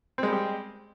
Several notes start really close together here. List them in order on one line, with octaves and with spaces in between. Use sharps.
C4 G#3 G3 G4